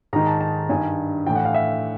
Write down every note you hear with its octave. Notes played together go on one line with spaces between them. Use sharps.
G#2 D#3 A#5
A5
A5
G2 D#3 G#5
A2 E3 G5
F#5
F5
E5